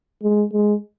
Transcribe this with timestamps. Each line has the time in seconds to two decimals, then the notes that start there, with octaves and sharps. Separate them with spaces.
0.23 G#3
0.53 G#3